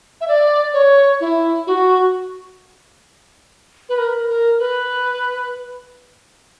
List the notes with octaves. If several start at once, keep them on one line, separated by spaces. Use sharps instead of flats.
E5
D5
C#5
E4
F#4
B4
A#4
A#4
B4